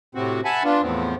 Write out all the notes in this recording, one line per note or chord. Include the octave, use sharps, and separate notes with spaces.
A2 C3 C4 F#4
E5 F#5 G#5 A5 B5
B3 D4 F4
E2 A2 F3 B3 C4